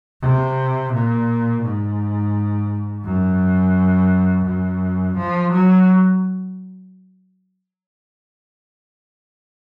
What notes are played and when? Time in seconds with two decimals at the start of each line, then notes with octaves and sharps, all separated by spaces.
0.22 C3
0.93 A#2
1.63 G#2
3.04 F#2
4.45 F#2
5.17 F3
5.52 F#3